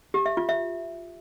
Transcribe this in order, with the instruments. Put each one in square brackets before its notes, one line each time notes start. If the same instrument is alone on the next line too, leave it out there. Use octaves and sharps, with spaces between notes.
[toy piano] G4
E5
F4
E5